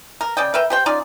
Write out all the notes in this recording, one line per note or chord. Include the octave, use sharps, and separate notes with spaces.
A#4
C#3 D5 D#5 G5
A#4 B4 E5 G5
G4 C5 G5
C#4 D#4 F4 D5